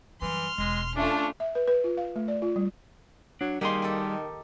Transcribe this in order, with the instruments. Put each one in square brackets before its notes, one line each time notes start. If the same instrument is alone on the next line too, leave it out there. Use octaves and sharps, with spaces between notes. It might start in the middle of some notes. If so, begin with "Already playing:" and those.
[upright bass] F#2 G3 [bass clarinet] E3 [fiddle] C6 F6
[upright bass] E1 [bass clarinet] G#3
[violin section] A3 [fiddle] C#4 F4 [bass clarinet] D4
[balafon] E5
B4
B4
F4
F5
A3
D5
F4
G3
[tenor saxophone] F#3 [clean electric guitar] D4
[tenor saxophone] D#3 [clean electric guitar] G3 G#4 C6 [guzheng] A#3 D#4
[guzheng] G4 A4